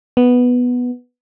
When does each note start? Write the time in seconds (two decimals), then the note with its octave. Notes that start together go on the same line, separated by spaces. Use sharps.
0.17 B3